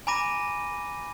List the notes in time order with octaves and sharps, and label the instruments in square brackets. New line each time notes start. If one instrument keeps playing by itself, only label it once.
[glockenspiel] G#5 A#5 B5 D6 A#6 D#7